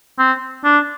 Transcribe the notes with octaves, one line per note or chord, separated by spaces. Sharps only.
C4
D4